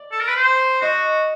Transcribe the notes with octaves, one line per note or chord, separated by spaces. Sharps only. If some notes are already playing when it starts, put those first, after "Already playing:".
Already playing: D5
A4
A#4
B4
C5
F#4 D#5